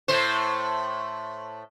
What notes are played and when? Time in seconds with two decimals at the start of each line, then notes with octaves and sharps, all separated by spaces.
0.08 A2 A3 C5